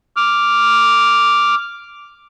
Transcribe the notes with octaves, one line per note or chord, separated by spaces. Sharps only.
D6 F6